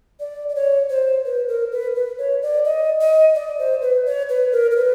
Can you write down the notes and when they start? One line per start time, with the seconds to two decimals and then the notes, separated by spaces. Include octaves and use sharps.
0.20 D5
0.49 D5
0.55 C#5
0.90 C5
1.25 B4
1.48 A#4
1.72 B4
1.95 B4
2.18 C#5
2.42 D5
2.65 D#5
3.01 D#5
3.35 D5
3.59 C5
3.82 B4
4.06 C#5
4.29 B4
4.52 A#4
4.71 A#4
4.76 B4